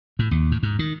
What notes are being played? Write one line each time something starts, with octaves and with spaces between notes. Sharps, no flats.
A2
D#2
A2
G#2
D#3